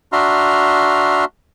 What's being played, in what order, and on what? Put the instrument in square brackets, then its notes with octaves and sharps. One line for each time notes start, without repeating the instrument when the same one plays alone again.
[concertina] D4 F#4 E5 A#5 C6 F6